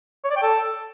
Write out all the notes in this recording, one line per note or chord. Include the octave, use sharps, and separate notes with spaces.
C#5
D5
G5
A4